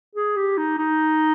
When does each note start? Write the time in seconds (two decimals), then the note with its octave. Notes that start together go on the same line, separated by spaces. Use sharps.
0.15 G#4
0.36 G4
0.58 D#4
0.78 D#4